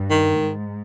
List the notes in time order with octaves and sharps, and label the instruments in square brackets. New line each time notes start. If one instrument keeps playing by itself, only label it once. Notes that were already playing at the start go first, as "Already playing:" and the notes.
Already playing: [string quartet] G2
[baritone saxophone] D#3
[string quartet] G#2